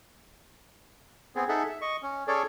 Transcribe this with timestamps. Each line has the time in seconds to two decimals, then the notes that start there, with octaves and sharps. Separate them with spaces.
1.36 B3 C4 G#4
1.49 D#4 G#4 A4 E5 F#5
1.69 E5
1.82 D#5 C#6
2.03 C#4
2.28 C#4 G#4 A4 C#5 D5